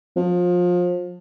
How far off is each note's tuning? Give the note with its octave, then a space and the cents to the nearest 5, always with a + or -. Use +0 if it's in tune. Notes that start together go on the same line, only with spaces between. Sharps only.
F3 +25